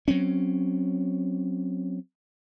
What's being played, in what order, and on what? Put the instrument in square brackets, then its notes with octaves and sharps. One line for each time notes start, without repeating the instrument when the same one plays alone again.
[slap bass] F#3 C4 C#4